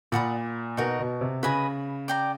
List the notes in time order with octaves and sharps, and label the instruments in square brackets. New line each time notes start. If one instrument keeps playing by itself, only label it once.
[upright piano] A#2 [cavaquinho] D5 F#5 B5 D#6
[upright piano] B2 [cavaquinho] D#4 F#4 A#4 D#5
[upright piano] B2
C3
[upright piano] C#3 [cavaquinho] B4 D#5 G#5 B5
[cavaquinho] D5 G5 A#5